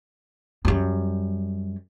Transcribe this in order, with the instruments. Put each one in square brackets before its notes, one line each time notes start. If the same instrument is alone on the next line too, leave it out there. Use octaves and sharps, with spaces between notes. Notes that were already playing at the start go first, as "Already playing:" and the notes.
[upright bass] F#2 G3